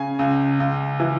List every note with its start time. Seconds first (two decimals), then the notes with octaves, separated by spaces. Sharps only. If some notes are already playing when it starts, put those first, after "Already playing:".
Already playing: C#3 G#5
0.19 C#2
0.60 C#2
1.00 E3